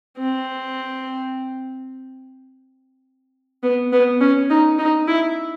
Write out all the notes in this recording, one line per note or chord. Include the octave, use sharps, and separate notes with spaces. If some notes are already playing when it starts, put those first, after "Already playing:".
C4
B3
B3
C#4
D#4
D#4
E4